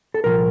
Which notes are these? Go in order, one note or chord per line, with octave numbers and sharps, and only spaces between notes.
A4
C2 A#2 F3 A#4